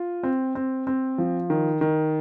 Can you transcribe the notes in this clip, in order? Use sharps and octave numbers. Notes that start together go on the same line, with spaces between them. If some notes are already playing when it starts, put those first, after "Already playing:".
Already playing: F4
C4
C4
C4
F3
D#3
D#3